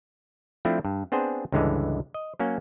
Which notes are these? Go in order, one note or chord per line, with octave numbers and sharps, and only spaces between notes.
F3 A3 C4 D4 E4
G2
B3 C4 D4 G#4 C5
C#2 G2 D3 E3 G#3
D#5
F#3 A#3 C#4